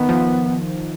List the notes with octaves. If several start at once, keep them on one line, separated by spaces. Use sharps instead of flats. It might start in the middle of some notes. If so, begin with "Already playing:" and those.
Already playing: D#3 B3
F3